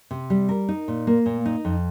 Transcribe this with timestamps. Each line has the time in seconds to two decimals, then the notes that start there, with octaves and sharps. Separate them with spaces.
0.11 C3
0.30 G3
0.49 A#4
0.69 D#4
0.88 A#2
1.07 A#3
1.26 A#2
1.46 D#4
1.65 F2